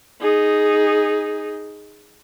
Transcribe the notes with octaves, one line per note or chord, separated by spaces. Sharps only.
D#4 G#4